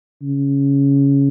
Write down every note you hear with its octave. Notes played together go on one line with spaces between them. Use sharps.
C#3